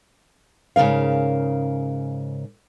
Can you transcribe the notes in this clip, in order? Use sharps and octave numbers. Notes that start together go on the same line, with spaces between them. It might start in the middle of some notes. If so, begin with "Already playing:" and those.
G#2 C#3 A3 A#4 F5